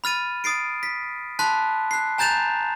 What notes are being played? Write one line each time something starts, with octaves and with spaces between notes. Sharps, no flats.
B5 F6 A6 D#7
D#6 A6 C7 D7
B6
A5 B5 C6 F#6 B6
F#6 C7
G#5 A#5 G6 A6 E7 F7